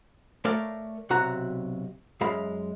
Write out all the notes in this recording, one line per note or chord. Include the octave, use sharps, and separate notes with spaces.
A3 A#4 C#5 D5 F5
B1 C3 F#4 F#5 A#5
F#2 G#3 F5 B5